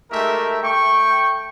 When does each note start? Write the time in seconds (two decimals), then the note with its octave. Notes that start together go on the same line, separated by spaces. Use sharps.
0.11 G#3 A3 D#4 G4 A#4 E5
0.63 A3 G5 C#6